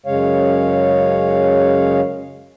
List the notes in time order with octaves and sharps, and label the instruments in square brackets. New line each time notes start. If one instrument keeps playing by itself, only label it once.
[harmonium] F#2 C#3 G#3 C#5 F5